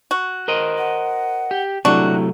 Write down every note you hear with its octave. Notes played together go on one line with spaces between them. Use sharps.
F#4
A#4 C5 D#5
F#5
G4
C3 F#3 A3 D4 E4 F#4